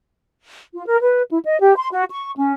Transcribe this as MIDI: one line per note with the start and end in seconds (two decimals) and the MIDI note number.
0.75 0.84 65
0.87 0.98 70
1.01 1.22 71
1.30 1.39 64
1.44 1.59 75
1.60 1.73 67
1.76 1.88 84
1.92 2.03 66
2.10 2.30 85
2.38 2.53 61